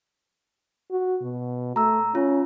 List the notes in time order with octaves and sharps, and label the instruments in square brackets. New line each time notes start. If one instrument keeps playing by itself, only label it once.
[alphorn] F#4
B2
[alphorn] A3 [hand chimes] A#5 E6
[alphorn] C#4 [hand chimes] F4